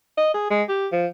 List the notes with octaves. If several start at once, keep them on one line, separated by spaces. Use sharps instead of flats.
D#5
G#4
G#3
G4
F3